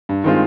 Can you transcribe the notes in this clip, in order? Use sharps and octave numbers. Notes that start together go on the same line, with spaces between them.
G2
D#3 G#3 C4 F4